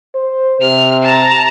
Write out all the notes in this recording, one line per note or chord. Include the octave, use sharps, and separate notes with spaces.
C5
C3 F6
A5 A#5